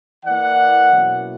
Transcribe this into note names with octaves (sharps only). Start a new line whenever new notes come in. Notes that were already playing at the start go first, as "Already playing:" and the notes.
E3 A#3 E4 D5 F#5
B2 F#3 A#3 C#4 E4